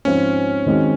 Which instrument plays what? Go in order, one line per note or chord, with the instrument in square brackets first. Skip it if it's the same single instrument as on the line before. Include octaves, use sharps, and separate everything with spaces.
[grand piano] G#2 F3 C4 F4 C5 [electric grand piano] C#4
[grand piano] D#3 G#3 C4 F#4